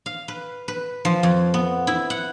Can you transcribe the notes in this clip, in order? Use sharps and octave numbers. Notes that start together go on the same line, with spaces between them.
F5
B4
B4
F3
F2
B3
E4
F#5